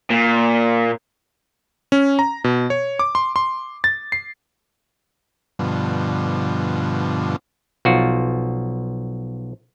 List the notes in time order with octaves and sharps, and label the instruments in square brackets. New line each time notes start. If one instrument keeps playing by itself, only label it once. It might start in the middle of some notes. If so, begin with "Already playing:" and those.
[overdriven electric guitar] A#2
[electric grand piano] C#4
A#5
B2
C#5
D6
C6
C6
A6
C7
[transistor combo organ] G2 B2 D3 F3
[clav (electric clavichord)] B1 F3 F4 F#4